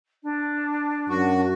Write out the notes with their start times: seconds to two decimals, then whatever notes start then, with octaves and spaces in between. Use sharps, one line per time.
0.23 D4
1.09 F#2 F#4